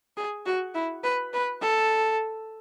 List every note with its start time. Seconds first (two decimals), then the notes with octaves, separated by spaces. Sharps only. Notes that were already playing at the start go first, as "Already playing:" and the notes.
0.17 G#4
0.46 F#4
0.74 E4
1.04 B4
1.33 B4
1.62 A4